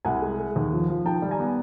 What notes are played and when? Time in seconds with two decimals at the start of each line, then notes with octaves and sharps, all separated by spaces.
0.05 C2 F#5 G#5
0.22 G#3
0.39 G#3
0.56 D#2
0.73 F3
0.89 F3
1.06 D#3 G5 A5
1.22 G3
1.31 G#5 A#5
1.39 B3